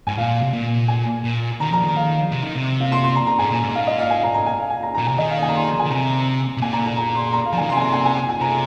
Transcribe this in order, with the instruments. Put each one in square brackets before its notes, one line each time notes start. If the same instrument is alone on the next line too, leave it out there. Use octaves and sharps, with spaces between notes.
[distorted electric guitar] G#2 [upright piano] G#5
[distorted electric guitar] A#2 [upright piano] F5
[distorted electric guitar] C3
A#2
[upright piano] G#5
[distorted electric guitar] A#2
[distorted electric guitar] D#3 [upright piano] A#5
[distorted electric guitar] F3 [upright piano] A#5
[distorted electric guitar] D#3
[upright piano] F5
[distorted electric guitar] C3
D#3
C3
[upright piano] F5
C6
C6
A#5
A#5
[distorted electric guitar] G#2 [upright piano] G#5
[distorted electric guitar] A#2
G#2
[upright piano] F5
D#5
F5
G#5
A#5
A#5
G#5
F5
G#5
A#5
A#5
[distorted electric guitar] A#2
[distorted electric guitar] C3 [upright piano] G#5
[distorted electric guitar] D#3 [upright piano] D#5
[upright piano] F5
G#5
A#5
C6
G#5
[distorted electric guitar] D#3
[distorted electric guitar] C3 [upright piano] A#5
[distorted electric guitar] C3
[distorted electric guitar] A#2 [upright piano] G#5
[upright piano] A#5
A#5
A#5
C6
A#5
F5
[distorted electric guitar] F3 [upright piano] A#5
[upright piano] G#5
[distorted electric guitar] D#3
[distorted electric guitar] C3 [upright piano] C6
[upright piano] G#5
A#5
G#5
G#5
G#5
G#5
[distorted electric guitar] C3 [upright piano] A#5